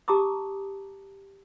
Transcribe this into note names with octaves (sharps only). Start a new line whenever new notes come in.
G4 A5 A#5 D6 D#6